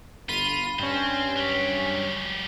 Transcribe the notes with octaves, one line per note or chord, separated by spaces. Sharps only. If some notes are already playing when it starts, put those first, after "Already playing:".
G1 F4 B5 D#7
G2 C4 C#4 C5
F#3 G4